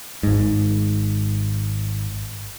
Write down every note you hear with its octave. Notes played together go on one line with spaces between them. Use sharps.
G#1 G#2